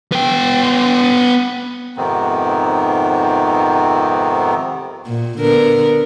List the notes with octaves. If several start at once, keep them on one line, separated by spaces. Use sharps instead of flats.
B3 G5
F2 G#2 C3 D#3 B3 C4
A#2
D3 B3 A#4